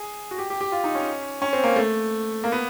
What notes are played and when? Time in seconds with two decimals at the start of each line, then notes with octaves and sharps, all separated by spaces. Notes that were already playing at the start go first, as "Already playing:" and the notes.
Already playing: G#4
0.31 F#4
0.39 G4
0.50 G4
0.61 G4
0.72 F4
0.84 D#4
0.95 C#4
1.42 C#4
1.53 C4
1.64 A#3
1.76 A3
2.44 A#3
2.52 B3